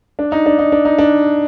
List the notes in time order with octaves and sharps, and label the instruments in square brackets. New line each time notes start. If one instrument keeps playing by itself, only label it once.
[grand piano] D4
D#4
D4
D#4
D4
D#4
D4